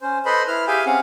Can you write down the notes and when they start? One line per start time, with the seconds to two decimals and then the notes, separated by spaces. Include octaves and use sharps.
0.02 C#4 C5
0.25 A4 B4 C5 D#5 B5 C6
0.47 E4 B4 F6
0.67 G4 G#4 E5 F5 G5 G#5
0.86 C4 C#4 F5 F#5